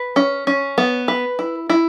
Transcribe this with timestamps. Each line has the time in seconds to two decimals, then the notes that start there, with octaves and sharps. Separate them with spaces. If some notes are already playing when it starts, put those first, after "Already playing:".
Already playing: B4
0.16 C#4
0.47 C#4
0.78 B3
1.08 B4
1.39 E4
1.70 E4